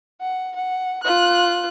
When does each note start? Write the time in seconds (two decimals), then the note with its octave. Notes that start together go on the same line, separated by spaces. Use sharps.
0.21 F#5
0.56 F#5
1.03 F4 F#6